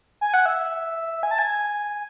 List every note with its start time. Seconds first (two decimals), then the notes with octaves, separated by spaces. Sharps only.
0.21 G#5
0.34 F#5
0.46 E5
1.23 G#5
1.31 A5
1.39 G#5